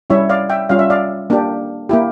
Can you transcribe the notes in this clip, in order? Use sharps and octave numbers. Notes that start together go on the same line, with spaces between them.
G3 C#4 E4 C#5 E5
D5 F5
E5 G5
G3 C#4 F4 F5
E5
D5 F5
A#3 D4 G4
A#3 E4 G4